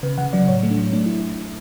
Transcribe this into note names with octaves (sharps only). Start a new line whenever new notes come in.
C#3 B4
C#3 F#5
F#3 D5
A2 C#5
A3
D4
F#3
A3 D4
E4